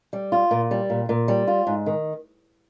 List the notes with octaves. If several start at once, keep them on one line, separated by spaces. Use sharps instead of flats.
G3
F4
A#2
G3
A#2
A#2
G3
F4
G#2
D#3